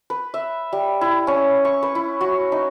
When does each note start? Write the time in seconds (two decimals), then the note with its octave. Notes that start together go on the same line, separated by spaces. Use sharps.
0.10 B4
0.34 E5
0.73 G3
1.01 E4
1.27 C#4
1.65 C#6
1.83 B4
1.95 E4
2.21 F#4
2.52 D#4